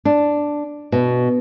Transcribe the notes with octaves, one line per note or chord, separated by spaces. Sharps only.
D4
B2